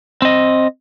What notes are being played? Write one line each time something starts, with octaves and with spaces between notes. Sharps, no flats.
C4 D#5